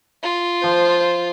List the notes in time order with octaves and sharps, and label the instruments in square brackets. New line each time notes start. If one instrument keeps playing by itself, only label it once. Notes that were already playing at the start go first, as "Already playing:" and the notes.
[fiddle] F4
[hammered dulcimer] F3 [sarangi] C5